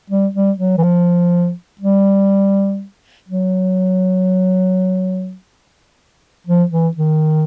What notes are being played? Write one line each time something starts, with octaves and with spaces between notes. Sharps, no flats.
G3
G3
F#3
E3
F3
G3
F#3
F3
E3
D#3